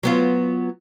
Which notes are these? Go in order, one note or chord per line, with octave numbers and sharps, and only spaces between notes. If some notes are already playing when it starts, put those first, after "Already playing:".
F#3 B3 F4